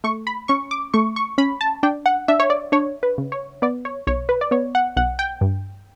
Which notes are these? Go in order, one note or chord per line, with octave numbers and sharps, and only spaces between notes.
A3 C#6
B5
C#4 C#6
D6
A3 C#6
C#6
C#4 B5
A5
D4 G5
F#5
D4 E5
C#5
D5
D4 C#5
B4
C#3
C#5
B3 D5
C#5
B1 C#5
B4
D5
B3 C#5
F#5
B1 F#5
G5
G2